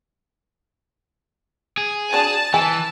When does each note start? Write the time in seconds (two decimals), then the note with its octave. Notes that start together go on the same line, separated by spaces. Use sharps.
1.77 G#4
2.13 F#3 D4 A5
2.54 E3 G#5